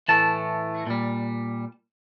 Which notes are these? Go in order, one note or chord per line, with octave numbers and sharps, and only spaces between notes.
A2 E3 A3 A5
A#2 G3